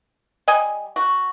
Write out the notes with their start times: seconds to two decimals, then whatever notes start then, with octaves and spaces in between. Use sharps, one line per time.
0.48 G3 D#5 G#5
0.96 F#4